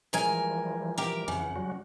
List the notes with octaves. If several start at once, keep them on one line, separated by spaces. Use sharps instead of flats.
E3 F3 G3 G#3 A#4 G#5
G4 A#4
F2 C#3 E3 F#5
F#3 G3 F#4